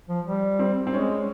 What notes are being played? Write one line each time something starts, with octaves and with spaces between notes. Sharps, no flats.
F3
G3
C4
C4
G#3 C#4